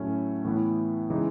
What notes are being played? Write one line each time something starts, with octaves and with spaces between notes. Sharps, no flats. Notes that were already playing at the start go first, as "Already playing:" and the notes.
Already playing: A2 F#3 A3 C#4 E4
A2 E3 B3 E4
C#3 E3 G#3 D#4